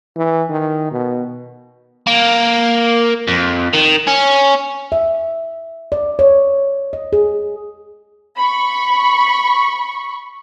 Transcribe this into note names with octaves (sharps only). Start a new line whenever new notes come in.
E3
D#3
B2
A#3
F2
D#3
C#4
E5
D5
C#5
D#5
G#4
B5 C#6